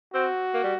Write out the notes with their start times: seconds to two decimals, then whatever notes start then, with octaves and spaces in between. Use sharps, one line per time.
0.14 C4 F#4
0.54 A#3
0.64 G3